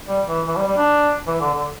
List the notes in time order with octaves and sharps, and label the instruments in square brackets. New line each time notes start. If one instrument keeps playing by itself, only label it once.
[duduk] G3
E3
E3
G3
G3
D4
E3
D3
D3